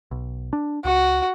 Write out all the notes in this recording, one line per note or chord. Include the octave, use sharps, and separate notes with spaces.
B1
D4
C#2 F#4